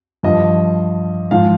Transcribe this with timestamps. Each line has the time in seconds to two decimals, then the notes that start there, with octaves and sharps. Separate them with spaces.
0.23 G2 F3 D#5
1.31 G#2 F3 F5